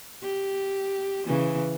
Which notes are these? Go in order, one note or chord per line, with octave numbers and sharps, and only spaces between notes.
G4
C#3 E3